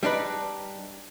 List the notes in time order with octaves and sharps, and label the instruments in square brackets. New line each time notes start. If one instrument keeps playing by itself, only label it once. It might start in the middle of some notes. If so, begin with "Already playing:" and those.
[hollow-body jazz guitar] G3 D4 D#4 B4